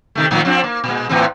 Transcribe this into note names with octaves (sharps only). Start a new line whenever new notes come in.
C3 D#3 A3
A2 D#3 F3
F3 C4 D4
A#3
A#2 G#3
A2 E3 C4